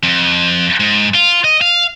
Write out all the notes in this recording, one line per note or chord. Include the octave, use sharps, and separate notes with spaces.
F2
G#2
F4
D#5
F5